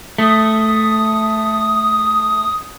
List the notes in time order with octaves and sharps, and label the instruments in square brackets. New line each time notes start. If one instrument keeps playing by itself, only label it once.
[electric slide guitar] A3 [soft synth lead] D#6